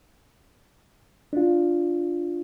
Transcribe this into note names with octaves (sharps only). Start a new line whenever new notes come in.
D4 F4